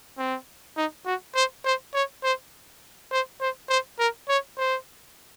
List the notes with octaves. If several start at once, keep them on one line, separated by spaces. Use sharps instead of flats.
C4
D#4
F#4
C5
C5
C#5
C5
C5
C5
C5
A#4
C#5
C5